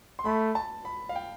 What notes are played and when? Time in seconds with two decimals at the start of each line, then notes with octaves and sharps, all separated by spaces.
0.19 C6
0.25 A3 B5
0.55 A5
0.85 B5
1.09 F5
1.15 G5